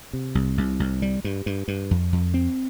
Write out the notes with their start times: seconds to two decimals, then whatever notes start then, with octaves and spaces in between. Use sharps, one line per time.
0.13 C3
0.35 C2
0.58 C2
0.80 C2
1.02 G3
1.24 G2
1.46 G2
1.68 G2
1.91 F2
2.13 F2
2.34 C4